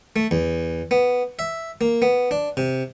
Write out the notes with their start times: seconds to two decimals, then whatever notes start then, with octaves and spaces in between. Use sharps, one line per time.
0.16 A3
0.31 E2
0.91 B3
1.39 E5
1.81 A#3
2.02 B3
2.31 D4
2.57 C3